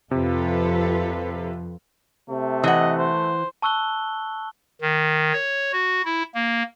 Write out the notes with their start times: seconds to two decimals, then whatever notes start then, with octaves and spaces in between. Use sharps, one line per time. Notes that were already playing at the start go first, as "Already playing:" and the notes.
0.11 F2 C3 F4 A4 B4
2.30 C3 A3
2.64 E3 D#5 F#5
2.98 C5
3.62 A5 C#6 E6 F#6 G7
4.81 D#3
5.33 C#5
5.72 F#4
6.05 E4
6.35 A#3